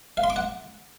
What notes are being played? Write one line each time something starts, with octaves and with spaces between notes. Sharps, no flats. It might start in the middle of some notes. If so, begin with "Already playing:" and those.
F5
C6
D6
F#5